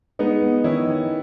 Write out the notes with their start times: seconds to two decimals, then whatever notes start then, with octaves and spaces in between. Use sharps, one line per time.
0.19 G#3 B3 D#4
0.42 B3
0.64 D#3 C#4 E4
0.87 D#3